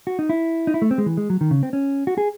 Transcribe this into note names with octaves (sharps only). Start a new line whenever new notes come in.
F#4
D#4
E4
D#4
E4
A3
C4
G#3
E3
G#3
F#3
D#3
C#3
C4
C#4
F#4
G#4